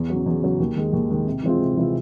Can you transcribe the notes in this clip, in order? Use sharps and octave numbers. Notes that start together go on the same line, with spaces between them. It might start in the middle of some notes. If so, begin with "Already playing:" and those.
Already playing: E2
C#3 F#3
E2
C#3 F#3
D#2
D#3 G#3
D#2
D#3 G#3
C3
E3 G#3 C4 F4
C3
E3 G#3 C4 F4